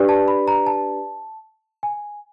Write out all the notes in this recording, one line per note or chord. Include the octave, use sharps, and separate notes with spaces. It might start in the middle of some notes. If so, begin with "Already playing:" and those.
Already playing: D4 G4 B4 D5
A5
B5
A#5
A5
G#5